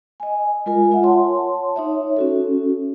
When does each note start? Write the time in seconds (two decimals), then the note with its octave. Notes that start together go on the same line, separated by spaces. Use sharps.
0.20 D#5 G#5
0.66 G#3 F4 A#4 G#5
0.91 F4 E5 F#5
1.03 C#5 A5 C6
1.76 D#4 C#5 E5
2.17 C#4 F#4 A4